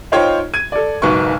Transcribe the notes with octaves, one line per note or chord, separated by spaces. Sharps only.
D#4 F4 C5 C#5 G5
G#6 D#7
A4 D5
F#1 B1 G#2 B3 C#6